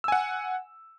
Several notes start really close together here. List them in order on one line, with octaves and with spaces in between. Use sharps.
E6 G#5 F#5